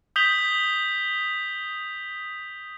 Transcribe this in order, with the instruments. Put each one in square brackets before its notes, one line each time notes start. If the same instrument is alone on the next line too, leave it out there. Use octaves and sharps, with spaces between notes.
[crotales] D#6 G6 B6 F7 G7